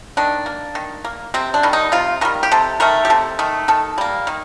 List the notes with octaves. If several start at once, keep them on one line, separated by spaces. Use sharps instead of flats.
D#3 D4
A#3
D#3
A#3
C3 C4
D4
D#3 G3
D#4
C3 F4
D#3 G3 A#4
G4
C3 A4
D#3 A3 A#4
G4
C3 A4
D#3 A3
D#3 A4
G3 A#3
D#3